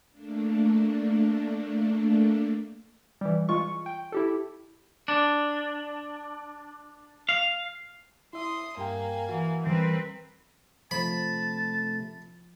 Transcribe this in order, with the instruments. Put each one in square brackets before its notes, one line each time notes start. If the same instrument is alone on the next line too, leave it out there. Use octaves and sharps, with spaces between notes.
[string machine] A3 A#3 D4
[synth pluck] E3 G3
G#3 F4 C#6
G5
E4 G4 A4
[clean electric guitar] D4
F5
[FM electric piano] E4 E5 [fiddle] C6 D#6
[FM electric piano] G2 G4 G5 [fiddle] A#3 G#5
[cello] E3 [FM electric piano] F#4
[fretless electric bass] E3 G3 [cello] C4 B4 [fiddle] A#4
[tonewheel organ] C3 A3 [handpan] F3 [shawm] A5 [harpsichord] B5